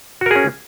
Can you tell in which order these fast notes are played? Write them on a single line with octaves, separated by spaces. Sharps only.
F#4 A#4 G#4 C#4